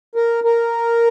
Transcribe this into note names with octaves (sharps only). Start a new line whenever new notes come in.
A#4
A#4